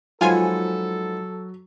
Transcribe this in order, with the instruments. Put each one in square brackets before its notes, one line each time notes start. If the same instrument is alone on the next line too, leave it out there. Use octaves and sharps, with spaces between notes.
[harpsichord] G#2 F3 B3 [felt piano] F#3 [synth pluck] F4 G#5 [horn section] A4